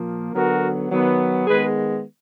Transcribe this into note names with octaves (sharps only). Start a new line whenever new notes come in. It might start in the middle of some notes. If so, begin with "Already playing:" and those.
Already playing: A#2 F3 A#3
D3 F#3 B3 F#4 A#4
D#3 F#3 B3
D#3 G#3 B3 G#4 B4